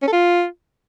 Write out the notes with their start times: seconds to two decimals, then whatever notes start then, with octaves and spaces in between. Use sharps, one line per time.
0.02 C#4
0.07 A4
0.12 F4